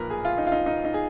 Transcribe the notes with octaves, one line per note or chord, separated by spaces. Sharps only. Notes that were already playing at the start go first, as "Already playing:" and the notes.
Already playing: B1 A#2 F3 A#4 B4
G#4
F4
D#4
F4
D#4
D#4
D#4
G#4